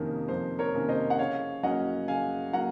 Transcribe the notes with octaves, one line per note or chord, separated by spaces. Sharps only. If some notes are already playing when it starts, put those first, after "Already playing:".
Already playing: F2 C3 D#3 A#3 C#4 A#4
F2 C5
A#4 C#5
C3 D#3 A#3 C#4
C5 D#5
F#5
C#3 C#5 F5
F#3 A#3 C#4 D#5 F#5
C#3 F5 G#5
F#3 A#3 F#5 A#5